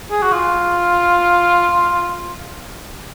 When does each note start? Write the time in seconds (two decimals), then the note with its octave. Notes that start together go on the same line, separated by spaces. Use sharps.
0.11 G#4
0.22 F#4
0.32 F4